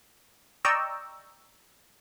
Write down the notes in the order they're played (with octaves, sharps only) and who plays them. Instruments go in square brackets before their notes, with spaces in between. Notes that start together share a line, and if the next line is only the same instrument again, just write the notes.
[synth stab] D5 D#5 G5 A#5 C#6 E6